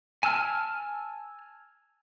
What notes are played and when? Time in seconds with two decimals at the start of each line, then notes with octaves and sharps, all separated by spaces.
0.23 G#5 A5 E6 F6